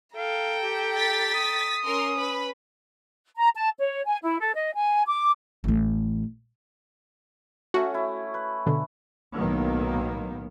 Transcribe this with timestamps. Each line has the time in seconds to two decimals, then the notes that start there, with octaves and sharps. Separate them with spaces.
0.16 A4 F5 G5 A#5
0.63 G4
0.96 A6 B6
1.34 D#6
1.85 C#4 A#4 C6
2.18 B4 B5
3.36 A#5
3.55 A5
3.78 C#5
4.06 G#5
4.21 E4
4.39 A4
4.55 D#5
4.74 G#5
5.09 D6
5.64 A1 A3
7.74 A3 C#4 F#4
7.94 E4
8.34 B4
8.66 B2 D3
9.35 B1 A2 D#3 F#3 A#3 B3